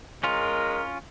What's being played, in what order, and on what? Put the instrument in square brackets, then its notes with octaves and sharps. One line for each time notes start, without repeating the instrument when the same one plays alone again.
[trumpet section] G#3 A#4 [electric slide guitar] C#4 F4